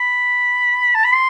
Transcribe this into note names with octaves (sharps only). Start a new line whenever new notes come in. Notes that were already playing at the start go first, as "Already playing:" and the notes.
Already playing: B5
A5
B5
C6